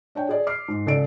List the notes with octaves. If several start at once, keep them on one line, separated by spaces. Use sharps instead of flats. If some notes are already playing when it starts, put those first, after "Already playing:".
D4 C#5 G5
G#4 D5
D6 F6 C7
G#2
C#2 A4 D5 D7